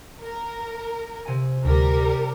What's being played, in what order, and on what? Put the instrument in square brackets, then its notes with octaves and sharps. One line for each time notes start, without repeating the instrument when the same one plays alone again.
[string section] A#4
[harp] C3 G#5
[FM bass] D2 [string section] G3 A#4